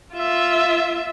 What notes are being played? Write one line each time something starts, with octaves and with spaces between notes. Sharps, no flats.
F4 E5